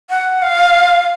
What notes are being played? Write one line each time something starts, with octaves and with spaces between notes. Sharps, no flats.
F#5
F5